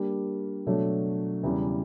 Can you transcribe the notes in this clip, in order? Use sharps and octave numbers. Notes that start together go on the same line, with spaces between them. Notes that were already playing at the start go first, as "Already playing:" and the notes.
Already playing: G3 A#3 D4 G4 A#4
B2 F#3 A3 D4
E2 C#3 E3 G3